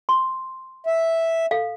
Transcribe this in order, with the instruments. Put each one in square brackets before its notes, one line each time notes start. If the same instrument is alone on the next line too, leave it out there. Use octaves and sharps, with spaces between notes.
[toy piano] C6
[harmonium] E5
[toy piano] A4 F5